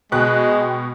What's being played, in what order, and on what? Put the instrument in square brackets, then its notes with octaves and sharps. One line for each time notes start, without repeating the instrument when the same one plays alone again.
[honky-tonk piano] B2 F#6 [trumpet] G#3 [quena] G5